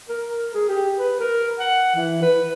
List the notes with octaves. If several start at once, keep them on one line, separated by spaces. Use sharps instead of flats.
A#4
A#4
G#4
G4
B4
A#4
F#5
E3
B4